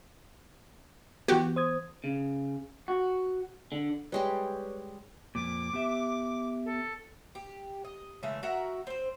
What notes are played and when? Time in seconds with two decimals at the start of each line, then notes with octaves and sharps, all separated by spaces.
1.28 E3 B3 F#4 G4
1.56 C5 D#6 G#6
2.04 C#3
2.88 F#4
3.72 D3
4.12 G3 G#3 G4 B4 C#5
5.35 F2 A#2 D6
5.73 B3 G4 E5
6.65 A4
7.35 G4
7.85 D#5
8.23 C#3 E3 G#3 A3
8.43 F#4 A#4 E5 F#5
8.87 C4 C5